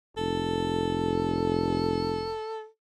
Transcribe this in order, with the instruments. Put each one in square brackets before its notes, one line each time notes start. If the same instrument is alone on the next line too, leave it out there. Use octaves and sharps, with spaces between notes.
[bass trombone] F1 [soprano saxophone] A4